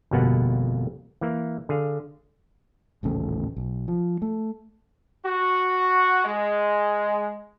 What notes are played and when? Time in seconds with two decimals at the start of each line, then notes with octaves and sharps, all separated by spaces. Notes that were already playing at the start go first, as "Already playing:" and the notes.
0.11 G1 F2 B2 A#3 B3 F#5
1.21 E3 A#3
1.69 D3 G#4 F5
3.03 D#1 A1 C#3 A3
3.57 B1
3.88 F3
4.22 A3
5.25 F#4
6.24 G#3